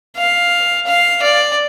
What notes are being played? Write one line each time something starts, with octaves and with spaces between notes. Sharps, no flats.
F5
F5
D5